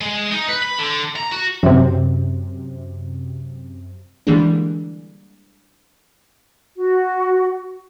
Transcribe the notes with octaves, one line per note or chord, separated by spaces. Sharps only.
G#3
D#4
B4
B5
D3
A#5
F#4
F#2 C3
D3 E3 G3 G#3 A#3 D4
F#4